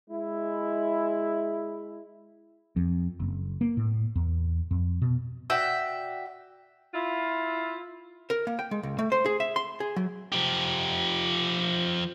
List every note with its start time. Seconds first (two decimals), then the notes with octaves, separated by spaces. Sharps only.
0.10 G#3 E4
2.76 F2
3.20 F#1
3.61 A#3
3.77 A2
4.15 E2
4.71 F2
5.02 B2
5.50 F#4 D5 E5 G5
6.94 E4 F4
8.30 A#4
8.47 A#3
8.59 G5
8.71 G#3
8.83 C#2
8.99 A3
9.12 C5
9.26 G#4
9.40 E5
9.56 C6
9.80 G#4
9.96 F#3
10.32 F3 G4